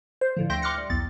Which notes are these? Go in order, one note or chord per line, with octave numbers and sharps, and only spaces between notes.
C5
A2 D3 F3
D2 E5 G5 C6 G6 A#6
C6 D6 F6 F#6 A#6 C#7
G3
B1 E2 A6